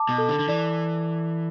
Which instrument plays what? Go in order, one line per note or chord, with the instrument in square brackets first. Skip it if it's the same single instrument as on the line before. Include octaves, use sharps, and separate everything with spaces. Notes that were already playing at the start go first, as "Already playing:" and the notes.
Already playing: [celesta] A5 D6
[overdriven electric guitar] B2
[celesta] A4
[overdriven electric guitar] D3
D3
[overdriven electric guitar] E3 [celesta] D5